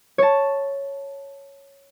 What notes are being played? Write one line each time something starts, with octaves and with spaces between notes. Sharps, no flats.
C#5 A5